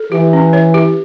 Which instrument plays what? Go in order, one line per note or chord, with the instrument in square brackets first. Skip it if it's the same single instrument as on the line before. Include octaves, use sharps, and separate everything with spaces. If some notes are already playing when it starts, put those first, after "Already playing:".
Already playing: [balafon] A4
[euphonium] E3 [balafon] G4
[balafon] C#4
C#5
G4